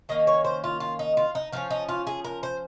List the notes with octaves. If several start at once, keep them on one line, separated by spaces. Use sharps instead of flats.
D#3 A#3 C#4 D#5
C#5
C5
F4
F4
D#4
F4
D#4
F3 A#3 C#4 F4
D#4
F4
G#4
A#4
C5